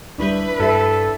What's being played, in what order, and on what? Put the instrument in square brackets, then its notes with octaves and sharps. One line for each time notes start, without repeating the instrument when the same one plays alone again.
[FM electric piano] D2 G3 [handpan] D4 E4 [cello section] B4
[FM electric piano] G2 [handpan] E4 G4 E5 [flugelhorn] A4